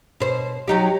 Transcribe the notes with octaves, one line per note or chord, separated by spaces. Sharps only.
B2 C5
F#3 D#4 G4